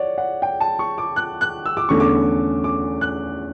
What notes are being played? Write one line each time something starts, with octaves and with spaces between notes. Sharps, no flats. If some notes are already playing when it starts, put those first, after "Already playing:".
Already playing: C#5 D5 F#5
F#5
G5
A5
C#6
D6
F#6
F#6
E6
D6
E2 D3 A3 C#4 C#6
D6
D6
F#6